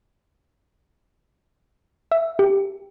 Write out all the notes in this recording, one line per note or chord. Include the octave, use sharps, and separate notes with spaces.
E5
G4